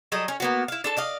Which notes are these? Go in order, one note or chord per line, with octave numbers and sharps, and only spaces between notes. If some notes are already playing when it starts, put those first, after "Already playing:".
F#3 G3 A4 D#5
C#4 C#5
A#3 B3 F#4
E4 F5
D4 A4 A5
D5 D#5 F5